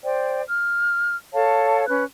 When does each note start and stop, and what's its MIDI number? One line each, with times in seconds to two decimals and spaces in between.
0.04 0.42 72
0.04 0.42 74
0.04 0.42 79
0.48 1.17 89
1.33 1.84 69
1.33 1.84 73
1.33 1.84 77
1.33 1.84 81
1.88 2.04 61
1.88 2.04 71
1.88 2.04 90